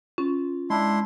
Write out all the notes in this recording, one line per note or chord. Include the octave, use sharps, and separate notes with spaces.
C#4 F4
G#3 D4 E4 C6